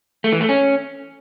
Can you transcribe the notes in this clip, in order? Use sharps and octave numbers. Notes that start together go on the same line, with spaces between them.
A3
E3
A3
C#4